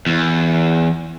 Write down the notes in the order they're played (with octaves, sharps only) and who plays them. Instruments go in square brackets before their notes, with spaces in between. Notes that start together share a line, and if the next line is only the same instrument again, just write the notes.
[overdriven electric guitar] E2